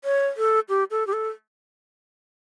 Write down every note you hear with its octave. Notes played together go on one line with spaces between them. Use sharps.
C#5
A4
G4
A4
G4
A4